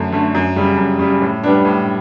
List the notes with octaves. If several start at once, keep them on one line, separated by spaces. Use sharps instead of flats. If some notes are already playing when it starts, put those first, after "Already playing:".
Already playing: F#2 D3 A3
D3 A3
F#2
C#3 G3
F#2
C#3 G3
A2
G3 B3 D4
A2